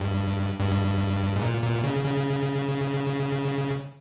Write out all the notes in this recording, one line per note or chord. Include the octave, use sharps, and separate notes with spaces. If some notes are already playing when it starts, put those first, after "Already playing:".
Already playing: G2
G2
G#2
A#2
A#2
C#3
C#3